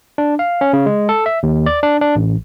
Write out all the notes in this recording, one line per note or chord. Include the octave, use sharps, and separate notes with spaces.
D4
F5
C#4
C#3
G#3
A4
E5
D#2
D5
D4
D4
A1